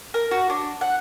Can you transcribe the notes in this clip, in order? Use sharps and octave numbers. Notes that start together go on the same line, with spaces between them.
A#4
F#4
D4
F#5